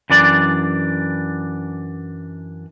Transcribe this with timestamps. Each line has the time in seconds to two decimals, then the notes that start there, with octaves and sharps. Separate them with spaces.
0.10 F#2 E3 D4 D5